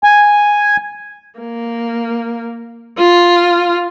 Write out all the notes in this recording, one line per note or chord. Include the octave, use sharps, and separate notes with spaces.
G#5
A#3
F4